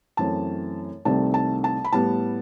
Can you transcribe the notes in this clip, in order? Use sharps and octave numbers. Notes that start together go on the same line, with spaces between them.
F#2 E3 A3 C4 A5
C2 C3 D#3 A3 C4 A5
A5
A5
B5
A2 G3 B3 A5